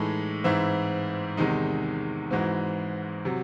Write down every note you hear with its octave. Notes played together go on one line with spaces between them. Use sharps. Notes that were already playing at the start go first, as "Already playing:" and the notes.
Already playing: A2 E3 G#3 D#4 A4
G#2 E3 C4 E4
E2 C3 D#3 G#3 D#4
G#2 E3 G#3 C4 F#4
C3 F#3